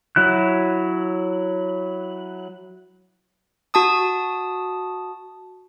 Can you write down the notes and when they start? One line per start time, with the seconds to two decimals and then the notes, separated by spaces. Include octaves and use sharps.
0.16 F#3 E4 F#6
3.74 F#4 A5 D#6